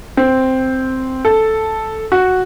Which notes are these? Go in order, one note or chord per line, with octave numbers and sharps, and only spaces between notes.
C4
A4
F#4